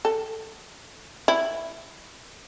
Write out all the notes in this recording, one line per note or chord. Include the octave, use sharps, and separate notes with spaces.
A4
E4